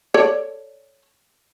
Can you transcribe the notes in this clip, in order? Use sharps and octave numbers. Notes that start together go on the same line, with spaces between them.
A4 C#5 D5